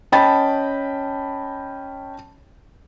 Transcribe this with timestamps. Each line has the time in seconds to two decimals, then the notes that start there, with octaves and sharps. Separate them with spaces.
0.12 C#4 D#5 G5 A5 B5 A6